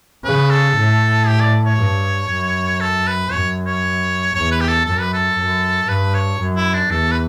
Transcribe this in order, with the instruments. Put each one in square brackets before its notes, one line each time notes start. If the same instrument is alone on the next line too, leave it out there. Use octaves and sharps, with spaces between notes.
[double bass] C#3 [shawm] B4
[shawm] A4
[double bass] A2
[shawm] G4
D5
C#5
[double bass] G2
F#2
[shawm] A4
B4
[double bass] F#2 [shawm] C#5
[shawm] C#5
[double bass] E2 [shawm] C#5
[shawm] B4
G4
A4
[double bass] F#2 [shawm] A4
[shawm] B4
A4
[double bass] F#2
[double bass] G2 [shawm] B4
[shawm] C#5
[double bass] F#2
[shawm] E4
D4
[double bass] E2 [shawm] A4
[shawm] B4